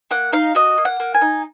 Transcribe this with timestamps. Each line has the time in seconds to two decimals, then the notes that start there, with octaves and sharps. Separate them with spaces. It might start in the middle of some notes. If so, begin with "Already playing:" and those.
0.11 A#3 F#5
0.33 D#4 F5
0.55 F#4 D#5
0.78 A#3
0.85 F#5
1.00 A#3
1.15 G#5
1.21 D#4